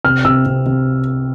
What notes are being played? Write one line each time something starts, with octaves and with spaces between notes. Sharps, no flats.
C3 F6
C3 E6
C3
C3